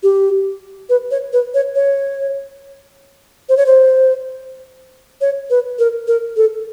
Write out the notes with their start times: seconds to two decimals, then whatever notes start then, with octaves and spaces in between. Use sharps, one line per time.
0.03 G4
0.89 B4
1.11 C#5
1.33 B4
1.54 C#5
1.75 C#5
3.49 C5
3.57 C#5
3.66 C5
5.21 C#5
5.50 B4
5.79 A#4
6.07 A#4
6.36 A4